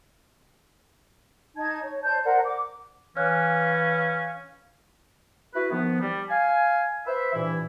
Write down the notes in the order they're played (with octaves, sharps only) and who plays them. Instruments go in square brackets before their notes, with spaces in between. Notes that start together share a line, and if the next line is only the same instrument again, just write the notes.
[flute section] D#4 A5 G#6
C#5
C5 D5 A5 G6
A#4 C5 D5 F#5
D6
[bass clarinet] E3 [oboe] C#4 [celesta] C#5 F6 F#6 [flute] F5
[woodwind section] E4 F#4 B4
D#3 F3 B3
G3
F5 G#5
B4 C5 E5
G2 A#2 E3 E4